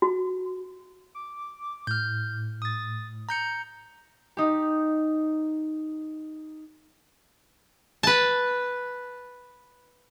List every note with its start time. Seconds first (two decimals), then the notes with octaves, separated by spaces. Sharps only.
0.02 F#4
1.15 D6
1.87 A2 F6 G6
2.62 D#6 A6
3.29 A#5 G6 C#7
4.37 D#4 G4
8.03 B4 A5